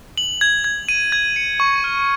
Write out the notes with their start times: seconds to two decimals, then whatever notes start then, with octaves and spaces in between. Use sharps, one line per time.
0.18 F#7
0.41 G#6
0.64 G#6
0.89 D#7
1.12 G#6
1.36 C#7
1.60 C#6
1.84 F6